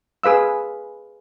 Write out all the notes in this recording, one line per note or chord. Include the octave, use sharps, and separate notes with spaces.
G#4 B4 F5 E6